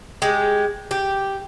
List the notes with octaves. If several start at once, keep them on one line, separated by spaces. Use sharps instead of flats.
G#3 G4
G4